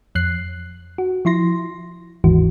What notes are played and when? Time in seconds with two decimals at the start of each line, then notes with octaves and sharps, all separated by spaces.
0.15 F2 F#6 C7
0.98 F#4
1.25 F3 E4 C6 A#6
2.24 G1 D#2 G#2 E3 F#4